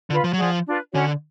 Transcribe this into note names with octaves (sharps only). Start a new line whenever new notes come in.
D3 F4 B4 F5 B5
F3
F#3
F3 G#4 D5 F#5
D4 F4 B4
D3 C#4 F#4 C#5